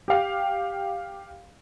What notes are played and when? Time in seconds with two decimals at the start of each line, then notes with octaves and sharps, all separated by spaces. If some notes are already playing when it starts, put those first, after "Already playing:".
0.08 G4 F5 G5